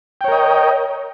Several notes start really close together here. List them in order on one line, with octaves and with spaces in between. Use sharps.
G5 C#5 A#4 D#5